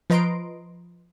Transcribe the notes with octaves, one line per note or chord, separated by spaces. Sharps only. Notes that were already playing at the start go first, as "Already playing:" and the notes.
F3 B4 D#5 A#5 C6 D7